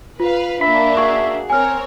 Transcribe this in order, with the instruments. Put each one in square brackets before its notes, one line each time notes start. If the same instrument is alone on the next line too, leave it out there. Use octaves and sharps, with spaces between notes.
[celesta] F4 [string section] B4 F5
[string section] A#3 D4 [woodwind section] E5 [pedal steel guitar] B5
[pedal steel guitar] F#4 G#4 [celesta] C#6
[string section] C4 A#4 C#5 [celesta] G#5 F6